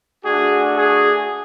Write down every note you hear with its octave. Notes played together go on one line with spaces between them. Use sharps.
A3 D4 F#4 G#4
G#4